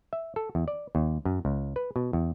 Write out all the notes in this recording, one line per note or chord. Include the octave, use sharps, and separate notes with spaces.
E5
A4
E2
D5
D#2
F#2
C#2
B4
B2
E2